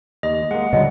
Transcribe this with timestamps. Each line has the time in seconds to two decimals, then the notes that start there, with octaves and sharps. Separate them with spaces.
0.23 D#2 D#5
0.51 G#3 A#3 F#5
0.73 C#2 A#2 D3 F#3 G3 D#5